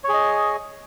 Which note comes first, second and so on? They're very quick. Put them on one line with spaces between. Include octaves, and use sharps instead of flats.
C#5 G#4 D#5